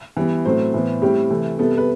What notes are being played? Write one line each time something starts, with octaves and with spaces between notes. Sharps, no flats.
E3 G3 B3
A2 F#3 A3 C4 C5
A2 E3 B3
A2 G3 C4 G4
C3 E3 A3
C3 G3 B3 A4
B4